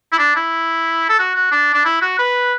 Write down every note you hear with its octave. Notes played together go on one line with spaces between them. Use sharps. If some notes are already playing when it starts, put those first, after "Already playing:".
E4
D4
E4
A4
F#4
F#4
D4
D4
E4
F#4
B4